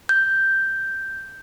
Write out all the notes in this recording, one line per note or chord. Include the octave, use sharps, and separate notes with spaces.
G6